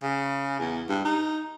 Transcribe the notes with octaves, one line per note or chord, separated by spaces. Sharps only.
C#3
E2
G2
D#4